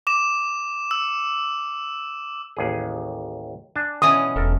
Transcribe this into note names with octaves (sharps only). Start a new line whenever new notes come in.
D6 E7
E6
A1 D#2 G#4
D4 G#5 A5
B2 E3 C#4 D#6
E1 A4 A#4